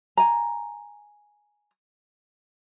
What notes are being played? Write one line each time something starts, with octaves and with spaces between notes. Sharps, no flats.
G#5 A#5